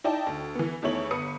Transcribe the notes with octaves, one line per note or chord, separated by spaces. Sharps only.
D#4 E4 D5 G5 A5
D2
E3 B3
E2 D#3 A3 E4 C#5 F#7
G1 B4 D#6 C#7